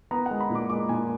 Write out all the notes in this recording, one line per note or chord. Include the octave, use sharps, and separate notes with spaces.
B3 A#5
G#3 F#5
B5
A#2
D6
G#3 D6
A#2 G#5